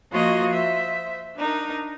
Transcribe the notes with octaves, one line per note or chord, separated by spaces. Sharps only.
F3 A#3 F4 F#4 C#5 D#5
C5 E5
D4 D#4 A#4